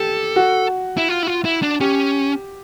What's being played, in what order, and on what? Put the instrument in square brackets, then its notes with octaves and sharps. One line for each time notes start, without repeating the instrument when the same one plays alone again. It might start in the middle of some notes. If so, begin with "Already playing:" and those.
Already playing: [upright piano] G4 [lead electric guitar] A4
[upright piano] F#4
[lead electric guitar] E4
F4
E4
F4
E4
D4
[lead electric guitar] C#4 [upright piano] G4